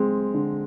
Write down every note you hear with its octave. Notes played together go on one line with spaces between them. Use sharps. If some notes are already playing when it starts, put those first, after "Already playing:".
Already playing: G#3 C4
D3